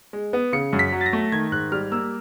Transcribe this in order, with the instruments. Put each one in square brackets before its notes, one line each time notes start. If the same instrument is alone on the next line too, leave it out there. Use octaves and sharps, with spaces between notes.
[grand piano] G#3
B3
C#3 C#7
F#2
B6
F#3
A6
A#6
A3
D#3 G#6
G#2 F#6
G3 F6
A#3 E6